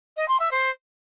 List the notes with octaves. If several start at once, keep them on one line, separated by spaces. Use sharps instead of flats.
D#5
C6
E5
C5